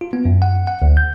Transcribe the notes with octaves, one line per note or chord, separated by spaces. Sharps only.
F4
B3
F#2
F#5
F#5
D2
G6